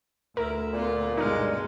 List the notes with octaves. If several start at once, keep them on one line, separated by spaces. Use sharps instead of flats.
D2 E4 A#4
A#2 B3 F4
G2 B2 G#3 D#4 F6